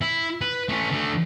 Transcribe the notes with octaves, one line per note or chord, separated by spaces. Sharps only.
E4
B4
A3 C#4
D3 A3